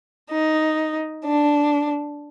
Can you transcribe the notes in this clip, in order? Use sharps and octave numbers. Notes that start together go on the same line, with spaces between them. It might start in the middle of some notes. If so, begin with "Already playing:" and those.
D#4
D4